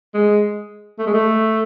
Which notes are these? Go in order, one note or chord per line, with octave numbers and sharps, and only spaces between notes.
G#3
A3
G#3
A3